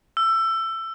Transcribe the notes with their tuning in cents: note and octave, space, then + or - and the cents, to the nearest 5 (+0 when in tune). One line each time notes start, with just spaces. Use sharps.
E6 +20